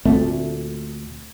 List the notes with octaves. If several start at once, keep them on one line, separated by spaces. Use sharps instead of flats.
D2 A#2 A3 C4